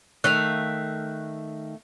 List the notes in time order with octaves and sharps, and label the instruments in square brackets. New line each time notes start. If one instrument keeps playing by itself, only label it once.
[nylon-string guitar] D#3 [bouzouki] A3 E5 F5 [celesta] F#6